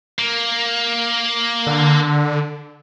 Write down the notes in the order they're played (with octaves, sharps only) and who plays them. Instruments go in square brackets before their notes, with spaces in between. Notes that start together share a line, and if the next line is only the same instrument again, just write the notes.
[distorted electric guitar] A#3
[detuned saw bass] D3